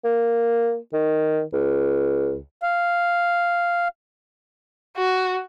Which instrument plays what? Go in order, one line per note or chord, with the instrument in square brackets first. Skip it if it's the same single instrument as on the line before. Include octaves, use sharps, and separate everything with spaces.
[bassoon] A#3
D#3
C#2
[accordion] F5
[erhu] F#4